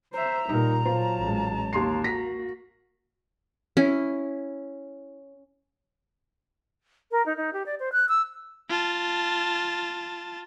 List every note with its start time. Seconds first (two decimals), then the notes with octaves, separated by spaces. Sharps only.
0.14 C5 E5 A#5
0.49 A#2 G3 D#4 A#4
0.86 F#3 F4 C5 A5
1.17 A1 G#3
1.73 D#2 A#3 C6 C7
2.04 F#4 A#6 B6
3.77 C#4 E4
7.12 A#4
7.26 D#4
7.37 D#4
7.53 G4
7.66 D5
7.80 C5
7.92 F#6
8.09 E6
8.70 F4 A5